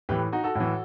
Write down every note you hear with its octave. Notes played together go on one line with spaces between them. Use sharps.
A2 E3 G4 B4
D#4 F#4
F#4 A4
A2 E3